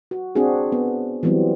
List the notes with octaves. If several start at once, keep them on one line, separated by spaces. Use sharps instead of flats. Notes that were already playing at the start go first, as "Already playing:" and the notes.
F#4
C4 D4 F#4 G#4
B3
E3 F#3 G3 B3 C4